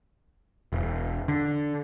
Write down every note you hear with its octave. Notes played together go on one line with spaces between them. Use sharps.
E1
D3